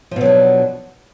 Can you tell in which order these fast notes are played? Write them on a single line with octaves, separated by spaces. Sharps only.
F3 B2 F#3 D4